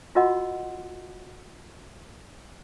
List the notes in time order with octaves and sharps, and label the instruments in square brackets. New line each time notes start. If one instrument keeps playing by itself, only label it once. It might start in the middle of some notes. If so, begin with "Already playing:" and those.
[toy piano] F4 F#4 A#4 D#5 F#5 C6